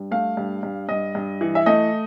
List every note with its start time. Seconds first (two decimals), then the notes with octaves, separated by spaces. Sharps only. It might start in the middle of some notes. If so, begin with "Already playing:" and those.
Already playing: G2
0.11 A3 F5
0.37 G2
0.63 G2
0.89 G2 D#5
1.15 G2
1.41 E3
1.55 E5
1.66 A3 D#5